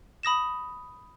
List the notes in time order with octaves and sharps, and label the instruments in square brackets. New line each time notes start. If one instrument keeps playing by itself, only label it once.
[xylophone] B5 D#6 A#6 E7